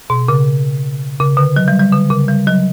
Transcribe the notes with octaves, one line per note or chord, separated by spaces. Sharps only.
B2
C#3
C#3
D3
F#3
G3
G3
D3
C#3
G3
F#3